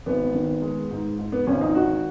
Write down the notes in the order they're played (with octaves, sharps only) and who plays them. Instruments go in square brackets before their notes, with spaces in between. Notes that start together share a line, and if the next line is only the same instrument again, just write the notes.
[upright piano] G#1 B3
D#3
G#3
G#2
G#2
B3
G#1 C#4
D#4
D#3 F#4